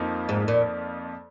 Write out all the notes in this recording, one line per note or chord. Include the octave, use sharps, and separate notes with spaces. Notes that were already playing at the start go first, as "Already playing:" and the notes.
Already playing: F2 F3 A#3 D#4
G#2
A#2